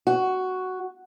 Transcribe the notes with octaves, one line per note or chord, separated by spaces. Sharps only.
F#4